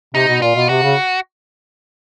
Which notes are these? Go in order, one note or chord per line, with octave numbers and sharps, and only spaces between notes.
C3 D#4
B2
A#2 F4
B2
C3 F#4
C#3